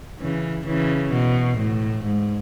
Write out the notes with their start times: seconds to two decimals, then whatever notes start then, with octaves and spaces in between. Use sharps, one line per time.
0.21 C#3 E3
0.66 C#3 E3
1.12 B2
1.58 A2
2.04 G#2